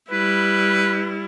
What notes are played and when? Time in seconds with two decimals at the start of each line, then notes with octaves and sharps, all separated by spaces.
0.11 G3 E4 B4